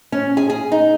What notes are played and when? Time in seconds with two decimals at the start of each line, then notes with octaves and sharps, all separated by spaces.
0.12 C#4
0.37 G#4
0.50 G#4
0.72 D#4